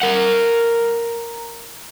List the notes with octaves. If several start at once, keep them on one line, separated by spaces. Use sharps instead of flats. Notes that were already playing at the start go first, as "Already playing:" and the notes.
A#4 F#5